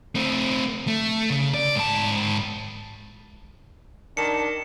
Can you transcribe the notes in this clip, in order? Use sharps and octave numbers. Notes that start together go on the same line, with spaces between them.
A3 C4
A3
C#3
D5
G#2 A5
D#3 D4 C#7 E7